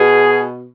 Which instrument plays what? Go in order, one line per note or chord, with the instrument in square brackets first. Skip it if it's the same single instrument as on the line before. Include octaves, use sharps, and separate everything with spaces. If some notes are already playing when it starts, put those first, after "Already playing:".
Already playing: [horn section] B2 G#4